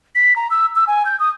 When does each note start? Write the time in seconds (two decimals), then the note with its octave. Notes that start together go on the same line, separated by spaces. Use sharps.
0.15 B6
0.36 A#5
0.50 E6
0.76 E6
0.87 G#5
1.05 G6
1.20 D#6